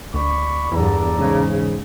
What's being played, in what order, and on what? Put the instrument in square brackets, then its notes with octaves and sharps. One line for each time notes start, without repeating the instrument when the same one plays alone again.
[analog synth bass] D2 [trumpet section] D5 B5 C#6
[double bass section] E2 G2 [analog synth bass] E3 [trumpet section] A4 D5 A#5
[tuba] G#2 [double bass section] C#3